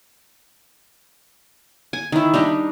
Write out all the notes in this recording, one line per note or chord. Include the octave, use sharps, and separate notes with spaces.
G#5
D#3 E4
G3 D4 D#4